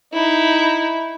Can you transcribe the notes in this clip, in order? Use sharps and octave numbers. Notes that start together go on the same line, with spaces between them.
D#4 E4